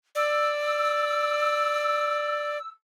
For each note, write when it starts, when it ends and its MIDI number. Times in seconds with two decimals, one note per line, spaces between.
0.15 2.58 74
0.15 2.67 88